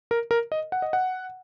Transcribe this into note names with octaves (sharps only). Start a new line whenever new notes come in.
A#4
A#4
D#5
F#5
D#5
F#5